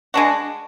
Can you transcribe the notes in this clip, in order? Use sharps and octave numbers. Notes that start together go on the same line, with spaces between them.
G#3 D4 F#4